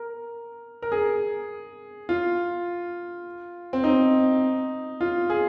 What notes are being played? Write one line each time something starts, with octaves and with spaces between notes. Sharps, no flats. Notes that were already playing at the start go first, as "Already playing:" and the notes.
Already playing: A#4
A#4
G#4
F4
C4
D#4
F4
G#4